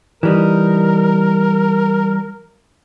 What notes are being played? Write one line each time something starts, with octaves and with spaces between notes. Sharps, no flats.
E3 G3 D#4 A#4